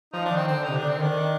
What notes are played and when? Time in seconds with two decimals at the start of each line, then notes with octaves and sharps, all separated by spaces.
0.13 F3 D#4
0.25 D4
0.31 D#3
0.36 C4
0.47 D3 C4
0.58 D3
0.64 C3 D#4
0.77 D3 D4
0.89 C4
0.97 D#3
1.02 D4
1.14 D#3